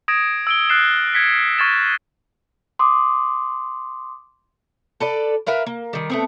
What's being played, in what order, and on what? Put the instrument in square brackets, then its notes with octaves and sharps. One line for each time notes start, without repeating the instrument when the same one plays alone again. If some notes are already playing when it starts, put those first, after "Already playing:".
[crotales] D#6 G#6 A#6 D7 E7
E6 D7 G7
F6 F#6 G#6 A6 C7 E7
F6 G#6 A#6 B6 C#7 G7
C#6 E6 F6 G#6 A6 E7
[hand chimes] C6 D6 D#6
[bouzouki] A4 B4 D5
A#4 B4 E5 F5
A#3
D#3 G3
A3 B3 C4